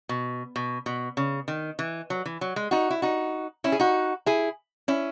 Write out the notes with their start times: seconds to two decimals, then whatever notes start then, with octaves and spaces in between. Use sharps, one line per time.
0.09 B2
0.56 B2
0.86 B2
1.17 C#3
1.48 D#3
1.79 E3
2.10 F#3
2.26 E3
2.41 F#3
2.56 G#3
2.71 D#4 F#4
2.90 E4
3.02 D#4 F#4
3.64 C#4 E4
3.72 G#4
3.80 D#4 F#4
4.26 E4 G#4
4.88 C#4 E4